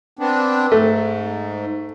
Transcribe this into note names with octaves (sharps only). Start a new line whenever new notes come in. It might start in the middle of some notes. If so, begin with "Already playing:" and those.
B3 C4 D4
G#2 A3